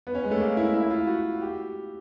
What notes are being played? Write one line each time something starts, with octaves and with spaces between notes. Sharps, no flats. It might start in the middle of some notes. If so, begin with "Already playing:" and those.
B3
C#4
G#3
A3
A#3
E4
E4
E4
F4
F#4
G4